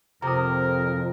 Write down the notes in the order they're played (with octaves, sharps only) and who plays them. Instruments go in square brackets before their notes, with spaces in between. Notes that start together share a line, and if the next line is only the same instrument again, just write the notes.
[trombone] F2 [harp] C3 D#6 [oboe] A#4 [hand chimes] A#5